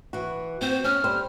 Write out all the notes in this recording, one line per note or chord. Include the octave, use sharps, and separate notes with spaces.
E3 F#4
C4 F#4 C5
C#4 F6
G3 C5